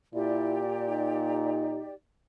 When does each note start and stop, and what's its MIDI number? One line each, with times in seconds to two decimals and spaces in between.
0.14 1.84 46
0.14 0.63 64
0.14 1.92 67
0.14 1.92 74
0.89 1.94 63